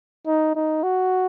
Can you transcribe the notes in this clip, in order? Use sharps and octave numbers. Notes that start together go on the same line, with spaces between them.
D#4
D#4
F#4